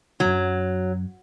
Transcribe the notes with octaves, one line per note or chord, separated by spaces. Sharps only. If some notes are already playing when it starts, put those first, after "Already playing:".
C2 F#2 F#3